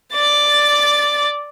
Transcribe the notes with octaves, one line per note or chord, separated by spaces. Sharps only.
D5 A6